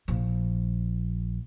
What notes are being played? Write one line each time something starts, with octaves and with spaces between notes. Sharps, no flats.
A#1 F3